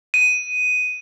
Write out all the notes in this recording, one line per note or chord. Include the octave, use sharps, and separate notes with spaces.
D#7